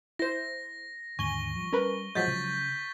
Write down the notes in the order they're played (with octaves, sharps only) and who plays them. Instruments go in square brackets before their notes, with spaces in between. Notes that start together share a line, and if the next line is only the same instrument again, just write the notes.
[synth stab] E4 C5 [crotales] A#6
[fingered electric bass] D#2 G#2 D3 [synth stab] G#5 [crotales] C#6 G7
[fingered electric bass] F3 G3
[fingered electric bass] G3 [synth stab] C#4 A#4 B4
[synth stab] F3 F#3 G#3 [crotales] G6 A6 B6
[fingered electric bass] C#3